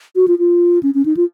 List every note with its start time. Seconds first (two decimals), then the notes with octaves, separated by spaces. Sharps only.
0.16 F#4
0.28 F4
0.39 F4
0.83 C#4
0.94 C#4
1.05 D#4
1.17 F4